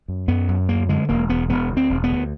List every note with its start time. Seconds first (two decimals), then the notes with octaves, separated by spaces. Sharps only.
0.08 F#2
0.28 F#2 B3
0.49 F#2
0.68 D2 A#3
0.89 D3 G#3
1.09 E1 A#3
1.29 E1 B3
1.50 E1 B3
1.70 D2
1.77 C4
1.90 E1
2.04 B3
2.10 D2